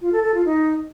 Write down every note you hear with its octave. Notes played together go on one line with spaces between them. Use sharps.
F4
A4
A4
F4
D#4